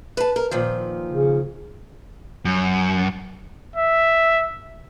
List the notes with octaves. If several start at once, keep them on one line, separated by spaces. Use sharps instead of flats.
B4 A5
A#4
A#2 D#3 F3
C#3
F#2
E5